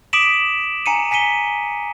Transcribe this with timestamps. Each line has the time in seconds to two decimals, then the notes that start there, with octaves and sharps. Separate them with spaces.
0.13 D6 D#6 B6 D7 E7 F#7
0.86 G#5 A#5 C#7 D#7
1.11 G#5 B6 C#7 D#7 G7